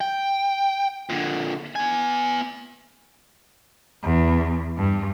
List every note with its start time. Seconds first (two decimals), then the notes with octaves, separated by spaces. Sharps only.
0.01 G5
1.10 A#2 D3
1.76 B3 G#5
4.03 E2
4.77 G2